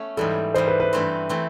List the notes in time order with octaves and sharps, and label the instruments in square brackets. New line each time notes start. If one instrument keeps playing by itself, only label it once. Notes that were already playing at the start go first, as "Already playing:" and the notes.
Already playing: [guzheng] A3 B3 C#4
[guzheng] G#2 E3 G3 [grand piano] A4
[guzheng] G#2 E3 G3 [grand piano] C5
[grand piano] B4
B4
[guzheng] G2 E3 A3 C4
E3 A3 C4